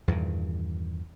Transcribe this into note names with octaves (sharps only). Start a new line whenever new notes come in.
E2 G2 A#2 D#3